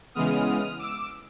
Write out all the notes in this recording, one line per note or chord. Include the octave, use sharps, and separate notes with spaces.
C#3 E3 G#3 B3 D#6 F6
D6 E6